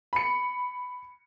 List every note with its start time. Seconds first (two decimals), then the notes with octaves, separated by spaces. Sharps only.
0.13 B5 C#7